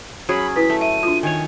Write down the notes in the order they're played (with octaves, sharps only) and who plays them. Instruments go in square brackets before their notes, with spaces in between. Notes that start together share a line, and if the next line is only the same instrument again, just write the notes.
[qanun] F#3 C#4 G#4 [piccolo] B5
[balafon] E4 B4 [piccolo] B6
[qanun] A3
[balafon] E5 [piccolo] D#7
[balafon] D4 F4
[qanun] D#3 C#5 [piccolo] G#5